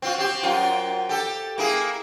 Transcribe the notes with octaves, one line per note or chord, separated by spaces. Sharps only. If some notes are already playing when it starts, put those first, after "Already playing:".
C4 F4 F#4
C4 G4
F#2 F4
G4 A4
A#3 E4 G#4